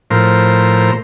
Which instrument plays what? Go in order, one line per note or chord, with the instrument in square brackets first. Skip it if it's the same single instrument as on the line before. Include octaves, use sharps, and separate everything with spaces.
[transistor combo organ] A2 F3 A#4 C5